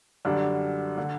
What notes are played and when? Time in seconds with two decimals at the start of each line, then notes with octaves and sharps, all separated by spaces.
0.25 F#2 D3 G3 D4
0.98 D3